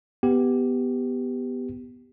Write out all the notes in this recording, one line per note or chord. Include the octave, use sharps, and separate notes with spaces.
B3 G4